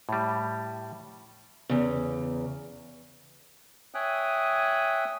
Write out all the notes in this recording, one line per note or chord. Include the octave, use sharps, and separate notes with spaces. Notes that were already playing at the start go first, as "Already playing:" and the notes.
A2 G3
E2 C#3
C#5 E5 G5 G#5 D#6 F#6